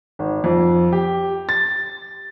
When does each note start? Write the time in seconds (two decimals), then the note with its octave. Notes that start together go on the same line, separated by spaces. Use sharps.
0.19 G#1
0.44 F2
0.93 G4
1.49 A6